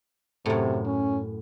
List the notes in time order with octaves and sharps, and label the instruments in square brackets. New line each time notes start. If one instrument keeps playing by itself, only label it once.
[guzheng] F#2 A2 [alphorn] C3
[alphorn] C#4